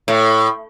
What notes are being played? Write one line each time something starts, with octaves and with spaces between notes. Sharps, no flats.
A2